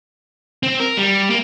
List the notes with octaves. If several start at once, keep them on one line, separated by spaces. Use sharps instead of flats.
C4
A#4
G3
A#3